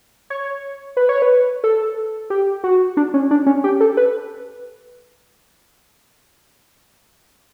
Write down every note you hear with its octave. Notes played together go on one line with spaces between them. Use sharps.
C#5
B4
C#5
B4
A4
G4
F#4
D4
C#4
D4
C#4
G4
A4
B4